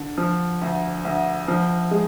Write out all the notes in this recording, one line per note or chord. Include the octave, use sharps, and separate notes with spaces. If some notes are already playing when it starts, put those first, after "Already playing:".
Already playing: D3
F3
D2
D2
F3
G#3